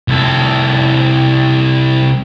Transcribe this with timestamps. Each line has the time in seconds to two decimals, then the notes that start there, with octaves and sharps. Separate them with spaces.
0.08 C2 A4